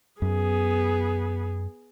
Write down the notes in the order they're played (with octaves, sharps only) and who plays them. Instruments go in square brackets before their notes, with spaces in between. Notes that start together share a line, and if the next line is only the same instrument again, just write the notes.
[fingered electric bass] F#2 [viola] B3 G#4